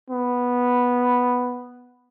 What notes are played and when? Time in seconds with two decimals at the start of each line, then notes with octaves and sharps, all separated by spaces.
0.10 B3